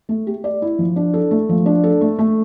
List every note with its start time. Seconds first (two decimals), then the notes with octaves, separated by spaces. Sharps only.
0.09 A3
0.27 G4
0.44 D5
0.62 E4
0.79 F3
0.96 D4
1.14 A4
1.31 A3
1.49 F3
1.66 D4
1.84 A4
2.01 A3
2.19 A3